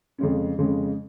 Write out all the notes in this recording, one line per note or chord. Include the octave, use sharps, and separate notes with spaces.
F2 C#3 G#3 C#4
F2 C#3 G#3 C#4